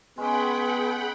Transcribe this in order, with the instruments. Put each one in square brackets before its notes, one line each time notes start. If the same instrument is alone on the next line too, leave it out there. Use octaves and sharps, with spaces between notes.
[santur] G#3 C#4 [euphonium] B3 [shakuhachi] G#4 [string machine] F#5 G5 B5